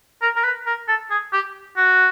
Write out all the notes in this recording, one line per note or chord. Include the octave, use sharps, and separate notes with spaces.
A#4
A#4
B4
A#4
A4
G#4
G4
F#4